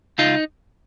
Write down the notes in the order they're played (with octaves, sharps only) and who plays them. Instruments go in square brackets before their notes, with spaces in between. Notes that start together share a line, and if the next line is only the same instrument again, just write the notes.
[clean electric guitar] C#2 D#4 F4